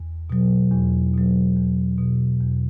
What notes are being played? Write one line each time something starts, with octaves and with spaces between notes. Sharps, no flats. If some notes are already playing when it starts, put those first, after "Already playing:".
Already playing: E2
B2 F#3
E2
B2 F#3
E2
B2 F#3
E2